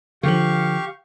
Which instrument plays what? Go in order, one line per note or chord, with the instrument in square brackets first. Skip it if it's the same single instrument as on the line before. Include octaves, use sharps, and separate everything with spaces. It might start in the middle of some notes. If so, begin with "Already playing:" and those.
[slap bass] D3 F3 [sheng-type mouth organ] G4 F5 C#6